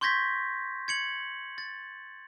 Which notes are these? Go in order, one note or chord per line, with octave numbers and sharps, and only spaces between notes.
C6 C#6 G6 G#6 A#6 B6
G#6 C#7 F#7
A6